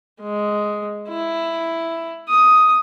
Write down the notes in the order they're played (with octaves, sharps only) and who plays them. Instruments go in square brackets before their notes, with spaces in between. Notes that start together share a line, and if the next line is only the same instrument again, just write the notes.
[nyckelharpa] G#3
E4
D#6